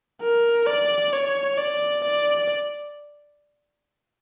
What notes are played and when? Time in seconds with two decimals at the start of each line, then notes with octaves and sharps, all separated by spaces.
0.22 A#4
0.67 D5
1.13 C#5
1.58 D5
2.04 D5